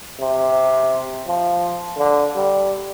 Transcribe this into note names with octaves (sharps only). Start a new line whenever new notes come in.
C3
F3
D3
G3